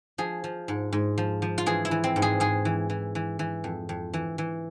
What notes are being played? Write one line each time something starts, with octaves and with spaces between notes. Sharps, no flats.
F3 G#4
F3
G#2
G#2
F3
F3
F4
E3 G#4
E4
E3
C4
G#2
G#4
G#2 G#4
E3
E3
E3
E3
F2
F2
E3
E3